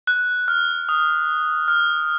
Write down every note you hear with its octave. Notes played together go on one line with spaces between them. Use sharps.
F#6
F6
D#6
F6